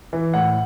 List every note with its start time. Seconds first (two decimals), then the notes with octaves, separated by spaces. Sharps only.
0.13 E3
0.34 A2 F#5